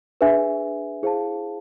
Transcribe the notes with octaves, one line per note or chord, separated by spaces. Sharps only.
D4 G#4 B4 E5 G#5
E4 G#4 C5 F5 A5